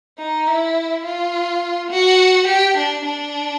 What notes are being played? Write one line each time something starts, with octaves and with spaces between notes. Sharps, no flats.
D#4
E4
F4
F#4
G4
D4
D4